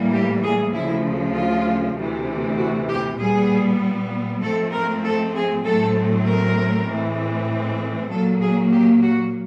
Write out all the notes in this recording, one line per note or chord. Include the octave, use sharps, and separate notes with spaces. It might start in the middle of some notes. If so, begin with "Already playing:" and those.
Already playing: A2 E3 G3 A#3
G4
G#4
D2 C#3 F3 E4
F4
D2 C3 E3
F#4
G4
A#2 G3 B3 G#4
G#2 F3 A3 C4 A4
A#4
A4
G#4
A2 F#3 A3 C4 A4
A#4
A2 E3 G#3 C4
A#2 F#3 A#3 A4
G#4
G4
F#4